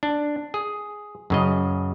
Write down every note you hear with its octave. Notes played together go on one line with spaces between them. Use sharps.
D4
G#4
F#2 C#3 D#5